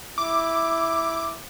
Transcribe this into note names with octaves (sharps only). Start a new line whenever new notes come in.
E4 D6